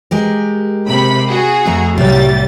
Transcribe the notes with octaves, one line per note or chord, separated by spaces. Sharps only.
G#3 G4 A#4
C3 B5
F#4 G#4
F2 A3 A#5
C2 A2 F#3 G3 C#5 A6